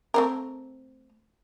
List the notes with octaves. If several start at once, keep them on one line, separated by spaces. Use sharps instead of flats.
A3 C4 A#4